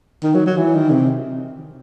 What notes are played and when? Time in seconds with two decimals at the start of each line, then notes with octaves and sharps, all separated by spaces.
0.23 D#3
0.35 F#3
0.46 F#3
0.57 E3
0.74 D#3
0.90 C3